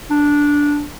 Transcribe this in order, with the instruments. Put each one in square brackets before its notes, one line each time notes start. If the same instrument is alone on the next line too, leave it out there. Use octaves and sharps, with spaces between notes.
[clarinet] D4